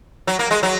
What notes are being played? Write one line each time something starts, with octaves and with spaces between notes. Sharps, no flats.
F#3
A#3
G#3
F#3